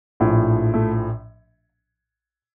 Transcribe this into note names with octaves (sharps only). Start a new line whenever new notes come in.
A#1 A2 F3
A3